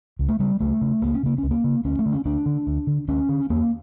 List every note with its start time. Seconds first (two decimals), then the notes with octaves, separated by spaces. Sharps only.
0.19 C#2
0.29 A3
0.40 C#3 G3
0.60 C#2 A3
0.81 C#3
1.02 C#2 A#3
1.14 C#4
1.23 C#3 A#3
1.38 C#2 C#4
1.51 A#3
1.64 C#3
1.85 D2 C#4
1.99 A3
2.06 D3
2.13 C#4
2.25 D2 D4
2.46 D3
2.67 D2
2.87 D3
3.08 D2 C#4
3.29 D3
3.50 E2 A#3